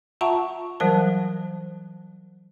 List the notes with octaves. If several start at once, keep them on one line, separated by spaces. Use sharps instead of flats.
F4 E5 F#5 A5 A#5 C#6
E3 F#3 G3 A#4 C5 A5